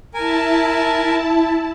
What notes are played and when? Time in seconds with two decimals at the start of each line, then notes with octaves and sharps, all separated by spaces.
0.14 E4 A#4 G#5 A5